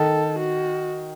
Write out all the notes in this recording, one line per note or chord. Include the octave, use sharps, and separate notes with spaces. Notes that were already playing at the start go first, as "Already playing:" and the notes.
Already playing: D#3 A4
F#4